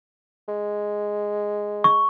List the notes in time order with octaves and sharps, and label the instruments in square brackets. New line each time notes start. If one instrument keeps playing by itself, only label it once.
[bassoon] G#3
[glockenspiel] C#6